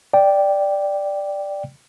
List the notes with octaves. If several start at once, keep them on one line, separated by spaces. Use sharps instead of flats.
D5 G5